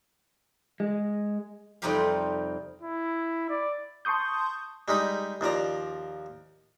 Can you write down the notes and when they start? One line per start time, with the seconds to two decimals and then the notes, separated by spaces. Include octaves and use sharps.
0.80 G#3
1.82 F2 C3 G3 D#4 G4 F5
2.82 E4
3.50 D5
4.05 A5 C6 C#6 D#6 G6
4.88 G3 G#3 D#4 B5
5.41 D#2 F3 D5 A#5